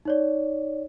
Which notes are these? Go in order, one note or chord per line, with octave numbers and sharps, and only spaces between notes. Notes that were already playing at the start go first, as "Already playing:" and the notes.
D#4 C#5 D5